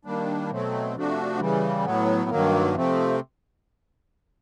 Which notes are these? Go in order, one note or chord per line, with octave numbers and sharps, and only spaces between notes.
D#3 G3 A#3 D4
B2 F#3 A3 C4
C3 F3 A3 D4 F#4
C#3 E3 G3
A2 F#3 B3
G2 D#3 F#3 A#3
C3 F3 A3 C4